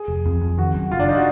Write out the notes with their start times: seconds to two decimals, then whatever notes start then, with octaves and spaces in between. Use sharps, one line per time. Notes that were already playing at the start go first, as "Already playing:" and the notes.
Already playing: G#4
0.08 F1
0.26 F2
0.42 F2
0.58 D#3 F#4
0.75 F#2
0.91 F#1 F4
1.00 D4
1.09 D#4
1.17 F#4